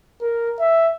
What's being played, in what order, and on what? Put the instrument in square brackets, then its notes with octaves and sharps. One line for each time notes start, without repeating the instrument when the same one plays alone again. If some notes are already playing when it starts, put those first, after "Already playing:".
[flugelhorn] A#4
E5